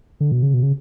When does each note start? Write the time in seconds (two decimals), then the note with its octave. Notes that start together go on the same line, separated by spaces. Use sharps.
0.20 D3
0.32 B2
0.43 C#3
0.54 B2
0.63 C#3